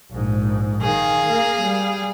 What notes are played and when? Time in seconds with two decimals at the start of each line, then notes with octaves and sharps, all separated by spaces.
0.11 A#1 G#2
0.82 D#3 G#4 F5
1.26 A#3
1.61 G3